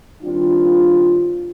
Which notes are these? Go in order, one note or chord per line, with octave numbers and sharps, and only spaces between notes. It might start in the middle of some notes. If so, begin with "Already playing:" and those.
D#3 G3 C4 D4 F4